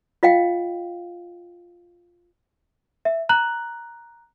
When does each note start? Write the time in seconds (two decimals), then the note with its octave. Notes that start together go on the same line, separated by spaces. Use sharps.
0.23 F4 D#5 F5 G5
3.05 E5
3.29 A#5 F#6 F#7